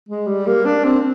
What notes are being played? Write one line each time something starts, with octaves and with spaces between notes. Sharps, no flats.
G#3
G3
A#3
D4
C4